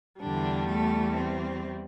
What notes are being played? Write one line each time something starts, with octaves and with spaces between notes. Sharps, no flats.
E2 D3 E3 G3 D4
A3 A4
C4